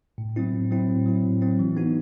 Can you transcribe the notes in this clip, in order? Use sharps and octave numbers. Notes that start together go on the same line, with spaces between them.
A2
F#3 C4 E4
A2
F#3 C4 E4
A2
F#3 C4 E4
A2
F#3 C4 E4
E3
B3 D#4 F#4